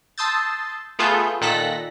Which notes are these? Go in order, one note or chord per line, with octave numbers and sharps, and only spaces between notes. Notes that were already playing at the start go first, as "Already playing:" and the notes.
A5 C6 D#6 E6 G6 A6
A3 B3 F4 G#4 A4 G6
A#2 D#3 A4 F#6 A#6 B6